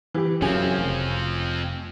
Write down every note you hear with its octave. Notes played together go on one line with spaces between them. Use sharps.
E3 G4
F#2 C#3 F3 C4 G#5
F1